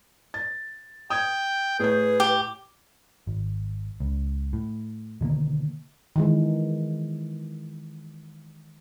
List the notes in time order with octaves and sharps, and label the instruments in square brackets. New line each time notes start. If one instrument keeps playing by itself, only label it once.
[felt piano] A6
[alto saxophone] G5 [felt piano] D#6 G#6
[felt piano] A2 G6 [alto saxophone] G#4 [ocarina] B4
[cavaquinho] G4
[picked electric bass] G#1
C#2
A2
B2 D3 D#3 A#3
[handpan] D#3 E3 G#3